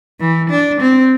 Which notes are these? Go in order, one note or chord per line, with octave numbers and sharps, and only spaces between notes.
E3
D4
C4